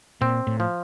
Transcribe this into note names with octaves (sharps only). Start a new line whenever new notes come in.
A#2 C4
A2
F3